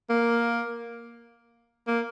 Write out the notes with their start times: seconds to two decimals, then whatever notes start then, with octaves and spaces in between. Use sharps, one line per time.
0.10 A#3
1.87 A#3